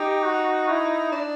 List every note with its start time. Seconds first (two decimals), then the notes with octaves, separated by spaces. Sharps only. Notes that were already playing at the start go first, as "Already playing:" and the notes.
Already playing: D#4 G4
0.23 F#4
0.68 E4
1.12 D4